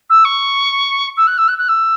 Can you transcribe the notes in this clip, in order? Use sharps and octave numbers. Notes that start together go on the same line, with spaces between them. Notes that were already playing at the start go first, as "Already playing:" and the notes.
E6
C#6
E6
F#6
E6
F#6
F#6
E6